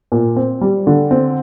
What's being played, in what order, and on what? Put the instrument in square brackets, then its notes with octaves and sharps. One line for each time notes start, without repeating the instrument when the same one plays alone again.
[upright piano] A#2
C4
G3
D3
C4